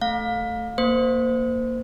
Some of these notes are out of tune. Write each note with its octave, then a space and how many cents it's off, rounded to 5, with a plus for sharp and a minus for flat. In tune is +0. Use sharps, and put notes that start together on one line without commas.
A3 +0 F5 +25
A#3 +0 C5 -25